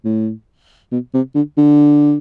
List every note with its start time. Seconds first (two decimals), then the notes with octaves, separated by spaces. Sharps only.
0.05 A2
0.92 B2
1.14 C3
1.35 D3
1.57 D3